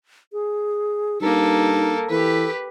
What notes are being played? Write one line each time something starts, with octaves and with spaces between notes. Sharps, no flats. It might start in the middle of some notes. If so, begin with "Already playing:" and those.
G#4
G2 A#3 D#4 A4
E3 G4 A4 B4